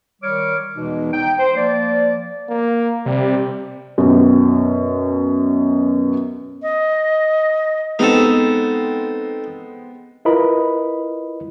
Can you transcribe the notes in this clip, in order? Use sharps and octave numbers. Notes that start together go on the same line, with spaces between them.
D#3 G3 C#5 D6 F6
E2 B2 E3 G#3 D#4
D#4 G5
C5
F3 A#3 D5
A#3
C3 G3
F#2 B2
D#5
G#3 B3 C4 D#4 A4
E4 F4 A#4 B4 D#5 B5